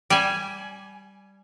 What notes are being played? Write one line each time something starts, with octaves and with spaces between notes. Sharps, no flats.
G3 G#5